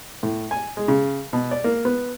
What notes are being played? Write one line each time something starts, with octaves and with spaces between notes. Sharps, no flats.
A2
G#5
G#3
C#3
B2
D5
A#3
B3